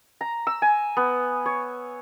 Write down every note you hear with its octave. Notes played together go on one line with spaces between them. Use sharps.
A#5
E6
G#5
B3
C#5